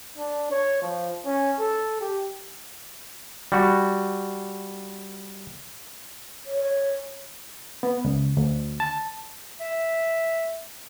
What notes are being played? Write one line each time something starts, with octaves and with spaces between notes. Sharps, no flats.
D4
C#5
F3
C#4
A4
G4
G3 F#4
C#5
B3
C#2
D2
A5
E5